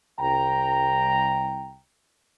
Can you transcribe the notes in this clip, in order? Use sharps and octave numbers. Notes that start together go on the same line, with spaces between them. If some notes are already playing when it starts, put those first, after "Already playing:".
C2 G5 A#5